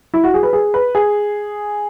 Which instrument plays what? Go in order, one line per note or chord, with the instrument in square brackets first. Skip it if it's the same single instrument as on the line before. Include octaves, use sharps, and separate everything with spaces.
[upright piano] E4
F#4
G#4
B4
G#4
B4
G#4